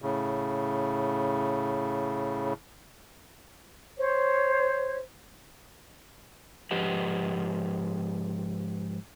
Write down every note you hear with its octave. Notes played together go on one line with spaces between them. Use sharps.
A2 C#3
C5 C#5
G#2 F3 G4 B4 D#5 F#5